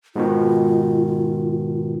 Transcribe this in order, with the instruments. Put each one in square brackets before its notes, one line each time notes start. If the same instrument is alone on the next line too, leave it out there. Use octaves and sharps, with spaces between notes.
[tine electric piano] G#2 B2 D#3 [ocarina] F4